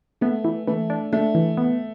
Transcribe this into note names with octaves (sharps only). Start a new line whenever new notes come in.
A3 B3
E3
E3 A3
D4
A3 D4
E3
B3